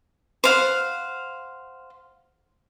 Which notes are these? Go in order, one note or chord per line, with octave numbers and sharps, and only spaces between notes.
C5 F5 F#5